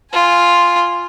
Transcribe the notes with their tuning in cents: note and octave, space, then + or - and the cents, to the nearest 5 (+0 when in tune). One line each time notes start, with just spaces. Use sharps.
F4 +0 G#5 +0